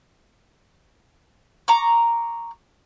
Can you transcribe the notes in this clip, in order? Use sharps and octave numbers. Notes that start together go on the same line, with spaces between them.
A#5 C#6 D6